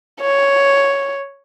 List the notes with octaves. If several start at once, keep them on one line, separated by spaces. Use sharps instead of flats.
C#5